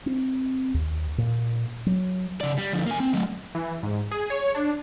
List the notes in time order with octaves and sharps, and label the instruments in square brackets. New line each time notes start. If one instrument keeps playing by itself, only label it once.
[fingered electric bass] C4
D#2
A#2
F#3
[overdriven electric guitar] C#3 D5
G3
D3 F3
A#3 G#5
C4
F#3 A3
[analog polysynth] E3
G#2
G#4
C#5
D4